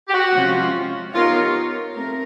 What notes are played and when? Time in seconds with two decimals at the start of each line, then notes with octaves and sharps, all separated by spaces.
0.08 G4
0.14 F#4
0.34 C3 F3 G#3 C#4 F4
1.14 B3 D#4 F4 G4 A#4 C#5
1.95 A3 C4 A#4